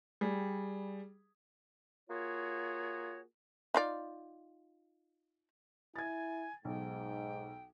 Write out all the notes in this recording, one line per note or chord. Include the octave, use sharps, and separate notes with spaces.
G3 G#4
A#3 F4 F#4 G#4 C#5
D#4 F4 D5
E4 G#5 G#6 A6
B1 G#2 G5